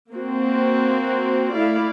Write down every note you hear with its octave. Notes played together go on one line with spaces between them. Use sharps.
A#3 C4 F#4
A3 E4 D5 F5